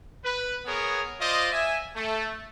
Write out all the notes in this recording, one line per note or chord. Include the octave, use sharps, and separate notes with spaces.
B4
B3 G#4 A#4 C#5
F4 C5 D5 D#5
E5 G#5
A3